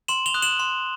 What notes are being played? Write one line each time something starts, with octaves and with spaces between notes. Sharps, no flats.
C6 E7 F#7
F7 G7
D#6 F#6
E7 F#7
C6